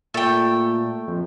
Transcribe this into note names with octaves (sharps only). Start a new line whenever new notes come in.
A#2 A3 G5
F2